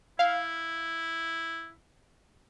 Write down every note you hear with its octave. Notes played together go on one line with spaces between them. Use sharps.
E4 F5